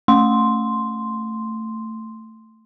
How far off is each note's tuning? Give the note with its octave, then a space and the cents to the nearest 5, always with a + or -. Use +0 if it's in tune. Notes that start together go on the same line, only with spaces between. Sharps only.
A3 +15 C6 +0